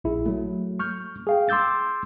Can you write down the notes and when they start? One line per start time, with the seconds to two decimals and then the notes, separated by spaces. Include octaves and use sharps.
0.04 A#1 E4 G#4
0.26 F#3 A3
0.79 C#6 F6 G6
1.27 G#4 F5 G5
1.49 C6 D6 E6 G6 A6